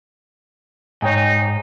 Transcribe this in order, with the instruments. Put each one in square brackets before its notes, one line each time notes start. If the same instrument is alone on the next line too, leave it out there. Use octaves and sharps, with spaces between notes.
[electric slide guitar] G#2 [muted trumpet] D#4 [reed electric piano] C#5 G5 G#5